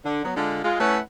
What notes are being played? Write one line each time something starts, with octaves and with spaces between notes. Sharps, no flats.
D3
F#3 B3
D3 G#3 F4
G#3 F4
A3 C#4 E4 B4 C#5 F#5